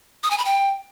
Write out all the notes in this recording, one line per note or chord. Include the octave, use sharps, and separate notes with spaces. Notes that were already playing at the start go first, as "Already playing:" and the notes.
D#6
G#5
B5
G5